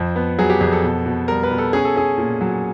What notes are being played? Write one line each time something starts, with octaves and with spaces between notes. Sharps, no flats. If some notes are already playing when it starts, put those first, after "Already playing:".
Already playing: F2 F3
B3
F#3 G#4
G4
F2 G#4
A4
B2
B2
G3 A#4
B4
B2
A4
C#4 G#4
A4
C#4 G#4
A#2
F#3